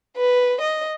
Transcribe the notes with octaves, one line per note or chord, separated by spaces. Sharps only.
B4
D#5